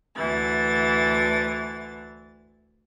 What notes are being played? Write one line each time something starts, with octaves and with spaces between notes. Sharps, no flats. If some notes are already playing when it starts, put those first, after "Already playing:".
D2 E3 A6